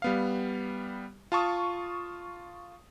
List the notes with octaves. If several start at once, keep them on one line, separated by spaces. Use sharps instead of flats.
G3 B3 F5
F4 A5 C#6 D#6